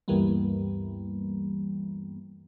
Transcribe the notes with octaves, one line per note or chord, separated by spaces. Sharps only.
D2 G2 E3 G3 A#3 B3